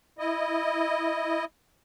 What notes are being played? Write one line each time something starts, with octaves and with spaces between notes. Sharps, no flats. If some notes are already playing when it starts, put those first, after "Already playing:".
E4 D#5